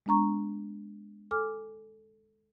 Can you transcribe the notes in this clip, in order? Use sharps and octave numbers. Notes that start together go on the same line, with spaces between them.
G#3 B3 D4 A#5 C#6
A4 G#5 D6 F6